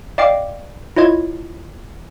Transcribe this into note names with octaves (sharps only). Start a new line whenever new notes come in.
D5 D#5 F5 G5 D6
E4 F4 C#5 D#5 G#6